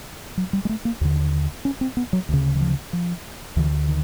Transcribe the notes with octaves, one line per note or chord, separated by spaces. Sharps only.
F#3
G3
G#3
A3
A#3
D#2 D3
C#4
C4
B3
F#3
D2 C#3
E3
F3
F3
D2 D3 E3
D#3